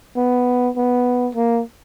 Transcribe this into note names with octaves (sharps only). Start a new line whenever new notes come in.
B3
B3
A#3